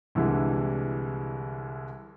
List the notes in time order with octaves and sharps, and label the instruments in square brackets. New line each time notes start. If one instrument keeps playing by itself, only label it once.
[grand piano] C2 D3 E3 G3 G#3